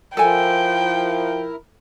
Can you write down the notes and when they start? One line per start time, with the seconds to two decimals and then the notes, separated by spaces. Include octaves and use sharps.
0.17 F3 E4 A4 A#4 G5 G#5